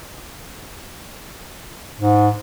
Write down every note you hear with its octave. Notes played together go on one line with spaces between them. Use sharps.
G#2